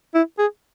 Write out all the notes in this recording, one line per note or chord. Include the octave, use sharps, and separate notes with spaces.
E4
G#4